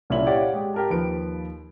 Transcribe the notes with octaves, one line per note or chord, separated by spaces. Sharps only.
C2 A#2 C#4 E4 E5 F#7
G4 C#5 D5 F5 F#5
G#3 G4
G4 A#4 A5
D#2 F3 B4 D7